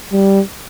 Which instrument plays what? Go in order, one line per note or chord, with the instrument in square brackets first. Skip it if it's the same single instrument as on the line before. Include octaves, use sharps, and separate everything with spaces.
[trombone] G3